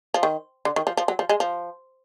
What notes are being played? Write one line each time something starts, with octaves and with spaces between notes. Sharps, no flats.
F3
D#3
D3
D#3
F3
F3
F#3
F3
G#3
F3